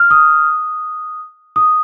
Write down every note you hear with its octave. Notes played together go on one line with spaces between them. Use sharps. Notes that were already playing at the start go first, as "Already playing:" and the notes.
Already playing: F6
D#6
D#6